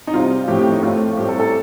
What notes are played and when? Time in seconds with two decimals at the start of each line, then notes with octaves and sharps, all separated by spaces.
0.07 D#4
0.13 C3 G3 C4 F4
0.47 A2 F3 A3 C4 G4
0.59 G4
0.71 D#4
0.82 A2 A3 C4 F4
1.17 A2 G3 C4 G4
1.29 A4
1.40 A4